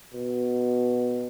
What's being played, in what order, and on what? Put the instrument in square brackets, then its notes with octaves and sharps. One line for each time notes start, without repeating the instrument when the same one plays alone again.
[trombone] B2